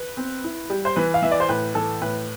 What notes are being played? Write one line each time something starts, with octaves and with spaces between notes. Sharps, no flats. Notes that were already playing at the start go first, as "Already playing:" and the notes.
Already playing: B4
C4
E4
G3
C5
E3 B4
F5
E3 E5
D5
C5
A2 B4
E3 A4
A2 B4